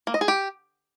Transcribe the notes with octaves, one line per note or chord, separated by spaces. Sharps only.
A#3
D#5
G#4
G4